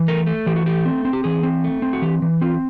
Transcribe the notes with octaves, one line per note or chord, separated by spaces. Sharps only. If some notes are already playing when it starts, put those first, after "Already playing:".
Already playing: E3
A3 A#4
A3
E3 G4
F#4
A3 G4
C4
C4
G4
E3 G#4
C4
A3
C4
F#4
E3 G4
E3
C4 F4